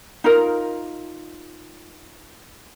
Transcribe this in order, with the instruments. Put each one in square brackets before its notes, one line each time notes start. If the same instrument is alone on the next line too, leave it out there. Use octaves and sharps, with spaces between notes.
[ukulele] D#4 F4 A#4